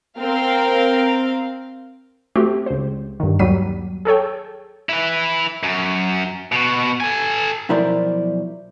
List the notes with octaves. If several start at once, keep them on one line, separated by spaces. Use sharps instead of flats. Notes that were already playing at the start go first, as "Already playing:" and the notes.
C4 A#4 F5 G5
A3 C4 F#4 G4
C#2 C5
G2 D#3
D#2 F#3 G3 B6 D#7
G#4 A4 C#5 G5
E4 B4
F#2
B2 F#4
A4 G#5
B1 F3 E4 A#4 C5 D5